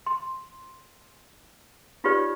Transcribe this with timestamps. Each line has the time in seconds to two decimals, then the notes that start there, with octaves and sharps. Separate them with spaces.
0.06 C6
2.04 D#4 F4 G4 B4 C#5 D5